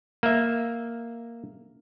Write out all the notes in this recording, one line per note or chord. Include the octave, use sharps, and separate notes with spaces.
A#3 E5